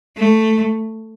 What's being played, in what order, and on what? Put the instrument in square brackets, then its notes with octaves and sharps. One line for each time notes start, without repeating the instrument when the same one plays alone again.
[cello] A3